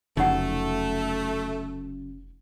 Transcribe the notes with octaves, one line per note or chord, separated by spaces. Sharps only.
F1 C#3 F#3 A3 D#4 F#5